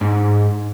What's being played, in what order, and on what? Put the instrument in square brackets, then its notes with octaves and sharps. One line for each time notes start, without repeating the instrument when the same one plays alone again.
[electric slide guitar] G#2